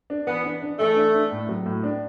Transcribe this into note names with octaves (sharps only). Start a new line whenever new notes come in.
D4
E3 B3
D4
D4
E3 A3
D4
D4
A2
F#3
A2
D4